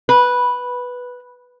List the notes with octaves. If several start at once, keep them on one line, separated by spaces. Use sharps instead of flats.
B4